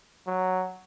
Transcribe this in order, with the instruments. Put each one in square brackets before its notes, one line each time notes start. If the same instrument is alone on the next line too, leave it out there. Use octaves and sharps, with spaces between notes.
[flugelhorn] F#3